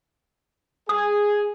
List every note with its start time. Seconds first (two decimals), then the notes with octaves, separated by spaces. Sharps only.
0.89 G#4 D#6